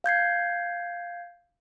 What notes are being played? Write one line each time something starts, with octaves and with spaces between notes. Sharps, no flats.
F5 G6 G#6 C7